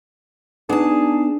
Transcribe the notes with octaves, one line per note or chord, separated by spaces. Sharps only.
B3 D4 D#4 G#4 A5